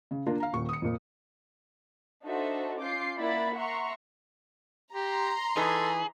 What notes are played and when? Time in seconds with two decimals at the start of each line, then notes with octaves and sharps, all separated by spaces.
0.11 C#3
0.26 A#3 D4 F4 A#4
0.40 F5 A#5
0.53 D#1 A#2 C#6
0.69 D#6 C#7
0.82 F2 A#2
2.25 D4 D#4 F#4 A4 C5 E5
2.79 C#4 F4 D6 G6 C7
3.18 A#3 E4 D5 F#5 B5 A6
3.56 E5 F#5 A#5 C6 C#6
4.93 G4 A#5 C6
5.57 E3 D#4 G#4 A4 B4